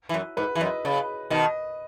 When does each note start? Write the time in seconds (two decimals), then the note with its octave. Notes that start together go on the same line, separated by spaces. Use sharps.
0.09 E3
0.14 F#2
0.37 G#2 B4
0.56 E3
0.61 F#2 D#5
0.85 C#3
1.30 B2 D#3 D#5